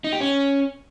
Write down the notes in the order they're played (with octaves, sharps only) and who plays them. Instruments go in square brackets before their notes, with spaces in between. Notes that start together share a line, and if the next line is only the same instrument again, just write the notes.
[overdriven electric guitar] D#4
G4
C#4